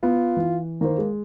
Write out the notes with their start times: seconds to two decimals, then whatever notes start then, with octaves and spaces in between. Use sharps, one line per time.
0.03 B3 F4
0.37 E3
0.81 D#3 A#3 C5
0.98 G#3